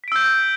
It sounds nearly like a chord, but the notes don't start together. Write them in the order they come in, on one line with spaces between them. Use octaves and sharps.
B6 D7 E6 G6